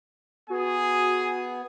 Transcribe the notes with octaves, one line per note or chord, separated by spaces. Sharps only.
B3 F#4 G#4 G#5